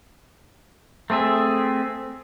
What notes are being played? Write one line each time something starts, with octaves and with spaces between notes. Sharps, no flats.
A3 C4 G#4 E5